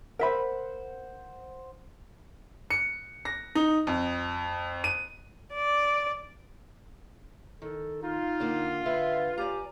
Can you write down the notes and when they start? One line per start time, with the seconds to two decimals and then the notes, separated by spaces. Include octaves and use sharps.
0.19 A#4 C5 E5 F#5 B5
2.70 C#7
3.25 A#6
3.55 D#4
3.87 F2
4.84 D#7
5.53 D5
7.62 D#3 A4
8.03 D#4 F4
8.40 D3 A#3 D4
8.86 D3 B4 E5
9.38 G4 D5 G#5 A#5